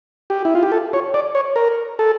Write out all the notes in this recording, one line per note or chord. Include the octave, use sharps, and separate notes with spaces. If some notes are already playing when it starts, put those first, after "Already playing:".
G4
E4
F4
G4
A4
C#5
D5
C#5
A#4
A4